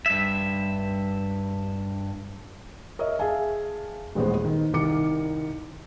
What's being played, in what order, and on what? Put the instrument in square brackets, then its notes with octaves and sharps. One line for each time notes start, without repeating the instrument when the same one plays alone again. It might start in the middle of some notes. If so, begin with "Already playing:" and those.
[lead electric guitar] G2 E5
[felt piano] A#4 C#5 D#5 E5
G#4 E5 F5 G#5 A5
D#1 A1 G#3 B3 C5
D#3
C2 D#3 A#4 D6 C#7